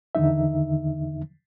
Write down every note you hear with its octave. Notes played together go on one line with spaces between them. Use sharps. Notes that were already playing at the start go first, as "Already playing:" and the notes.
E2 D3 D#3 D#4 E5